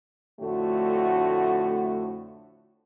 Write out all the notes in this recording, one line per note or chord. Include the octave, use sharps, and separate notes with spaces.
F2 A2 D3 A3 F#4